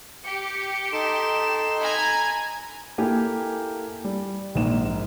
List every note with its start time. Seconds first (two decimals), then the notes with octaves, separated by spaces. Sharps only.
0.24 G4 C#7
0.92 D#4 A4 C6 E7
1.81 G#5 A#5 B5 G#6
2.98 A#3 E4 G4 A4 G#5
4.05 G3
4.55 A#1 G#2 A#3 E7